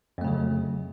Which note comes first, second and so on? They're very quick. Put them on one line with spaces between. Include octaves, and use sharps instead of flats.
F2 A3 C#3 F#3